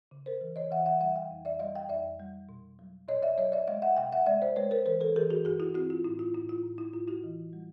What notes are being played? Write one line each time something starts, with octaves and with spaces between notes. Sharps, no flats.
C#3
A#4 C5
E3
C#5 D#5
E3 E5 F#5
E5 F#5
G3 E5 F#5
F5 G5
F2
D5 E5
G3 D#5 F5
F5 G5
F2 D5 E5
G3
B2
F#3
B2 C#5 D#5
D5 E5
F#3 C#5 D#5
D5 E5
G#3 D#5 F5
E5 F#5
C3 F5 G5
E5 F#5
G#3 D5 E5
C5 D5
G#3 B4 C#5
A#4 C5
E3 A#4 C5
A4 B4
E3 G#4 A#4
F#4 G#4
G2 F#4 G#4
E4 F#4
C4 E4 F#4
F4
A2 E4
F4
A2 E4
F4
A2
E4
A2 F4
E4 F#4
E3
G3